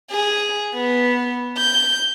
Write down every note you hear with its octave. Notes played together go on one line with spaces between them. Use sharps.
G#4
B3
G6